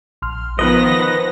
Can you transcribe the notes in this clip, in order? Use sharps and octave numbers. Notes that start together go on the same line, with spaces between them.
A#1 C6 F6
D#3 F3 B3 B4 C5 D#5 A#6